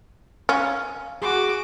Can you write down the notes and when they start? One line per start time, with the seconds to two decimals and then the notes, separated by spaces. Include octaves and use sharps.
0.49 C#4 F5
1.22 F#4 G#4 D6